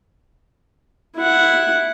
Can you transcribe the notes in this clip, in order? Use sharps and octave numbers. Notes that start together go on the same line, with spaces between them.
E4 F#5